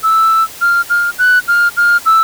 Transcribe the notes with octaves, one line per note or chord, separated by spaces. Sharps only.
E6
F6
F6
F#6
F6
F6
E6